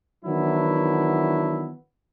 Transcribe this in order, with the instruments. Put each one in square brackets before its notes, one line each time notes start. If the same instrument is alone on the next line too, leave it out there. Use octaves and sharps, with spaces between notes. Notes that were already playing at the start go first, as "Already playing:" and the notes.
[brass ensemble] D#3 E3 F#3 B3 D4 E4